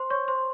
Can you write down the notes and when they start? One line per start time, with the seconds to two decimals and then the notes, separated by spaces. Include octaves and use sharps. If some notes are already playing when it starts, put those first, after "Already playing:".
Already playing: C5 C6
0.10 C#5 C#6
0.28 C5 C6